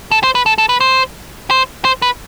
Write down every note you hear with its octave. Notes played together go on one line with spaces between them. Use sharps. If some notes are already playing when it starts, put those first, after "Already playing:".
A4
C5
B4
A4
A4
B4
C5
C5
C5
B4